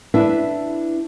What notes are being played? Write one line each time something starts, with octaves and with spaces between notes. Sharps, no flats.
D4 E4 B4 E5